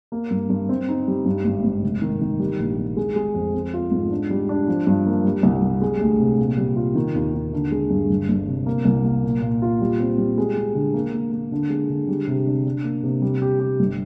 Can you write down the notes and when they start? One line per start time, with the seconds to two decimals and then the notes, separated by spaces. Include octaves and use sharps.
0.12 A#3
0.31 G2
0.50 G2
0.69 C4
0.89 D#4
1.08 G3
1.26 G2
1.45 G#1
1.64 G#1
1.82 F1
2.02 D#3
2.21 D#3
2.39 G3
2.59 A#1
2.77 G3
2.97 G#3
3.16 G#3
3.35 F2
3.54 C4
3.74 F4
3.91 G#2
4.11 D4
4.30 G3
4.49 D4
4.68 F3
4.87 G2
5.06 A#3
5.24 G3
5.43 C2
5.62 G3
5.82 G#3
6.01 D2
6.19 C3
6.39 A#2
6.58 G3
6.76 F4
6.95 D#3
7.15 D#2
7.34 D#2
7.53 D3
7.72 G#3
7.90 G2
8.10 G1
8.29 G1
8.48 C3
8.66 A#3
8.85 C2
9.05 A#3
9.24 A#2
9.42 A#2
9.62 F4
9.81 G3
10.00 C4
10.18 G3
10.38 G#3
10.57 G#3
10.75 D3
10.94 A#3
11.13 A#3
11.32 A#3
11.52 D3
11.70 G#3
11.90 D3
12.08 G3
12.28 C3
12.47 D4
12.65 D4
12.84 A#3
13.03 C3
13.22 G3
13.42 G4
13.60 G4
13.80 G1